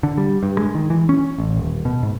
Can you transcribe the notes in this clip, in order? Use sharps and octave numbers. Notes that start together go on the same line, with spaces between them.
D3
G3
G2
G#3
D#3
E3
C#4
A1
D#1
B2
G#2